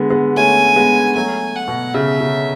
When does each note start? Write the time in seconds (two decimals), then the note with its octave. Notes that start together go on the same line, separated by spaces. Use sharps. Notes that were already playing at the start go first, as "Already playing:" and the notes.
Already playing: D3 G#3 B3
0.10 G#3 B3
0.36 A3 C#4 G#5
0.76 G#3 B3
1.16 F#3 A3 G#5
1.55 F#5
1.68 B2
1.94 C#3 E5
2.21 C#3